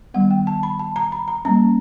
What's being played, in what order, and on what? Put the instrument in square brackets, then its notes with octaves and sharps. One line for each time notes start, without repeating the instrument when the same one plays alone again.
[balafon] D#3 G3 B3 F#5
G5
A5
B5
A5
A#5
B5
A#5
G3 A#3 C#4 A#5